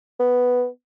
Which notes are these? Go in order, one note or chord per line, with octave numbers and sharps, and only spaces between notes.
B3